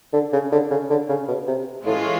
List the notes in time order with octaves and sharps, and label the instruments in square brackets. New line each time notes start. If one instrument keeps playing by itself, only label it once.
[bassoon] D3
C#3
D3
C#3
D3
C#3
B2
C3
[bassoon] A2 [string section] E3 G#3 C#4 F4